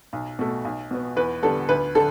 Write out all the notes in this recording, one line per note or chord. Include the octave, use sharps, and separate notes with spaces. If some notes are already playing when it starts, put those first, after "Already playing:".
B1
B2 A3
B1
B2 B3
E2 B4
D3 G3 B3 A4
D2 B4
D3 A4